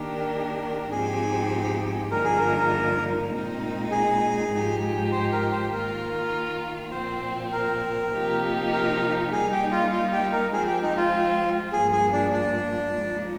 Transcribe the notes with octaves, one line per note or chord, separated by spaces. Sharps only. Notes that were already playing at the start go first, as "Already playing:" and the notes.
Already playing: D#3 A#3 D4 G4 A#4
G#2 F3 C4 D#4 G4 G#4
G2 D3 F3 A#3 D#4 A#4
G#4
A#4
A#2 G#3 C4 D#4
G#4
G#2 F3 G#3 D#4 G4
C5
A#4
C5
D#3 A#3 F4 A#4
A#2 F3 C4 C5
A#4
C3 F3 A#3 D#4 G4
A#4
G3 A#3 D#4 G#4
G4
F4
F4
G4
A#4
F3 G#3 C4 G#4
G4
D#4
F4
G2 F3 A#3 G#4
G#4
D4
D4
F3 G#3 D#4